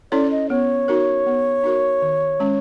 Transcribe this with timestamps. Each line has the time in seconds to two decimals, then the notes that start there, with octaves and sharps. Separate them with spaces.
0.12 C#4 E4 A4 C#5 D5
0.31 D#5
0.50 B3 C#5
0.88 D#4 F#4 A#4
1.26 B3
1.64 D#4 F#4 A#4
2.02 D#3
2.40 G#3 C#4